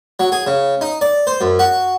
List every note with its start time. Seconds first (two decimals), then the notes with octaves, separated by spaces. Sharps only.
0.20 F#3
0.32 G#4
0.47 C#3
0.81 D#4
1.01 D5
1.27 C5
1.41 F#2
1.59 F#4